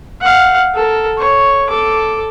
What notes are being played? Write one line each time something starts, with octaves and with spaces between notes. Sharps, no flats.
F5 F#5
A4 A#4
C#5
A4 D6